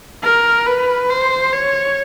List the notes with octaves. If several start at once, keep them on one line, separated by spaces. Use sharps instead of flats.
A#4
B4
C5
C#5